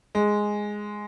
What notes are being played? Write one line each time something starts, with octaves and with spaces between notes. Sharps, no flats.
G#3